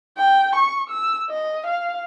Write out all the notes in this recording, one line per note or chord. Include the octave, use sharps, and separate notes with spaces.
G5
C#6
E6
D#5
F5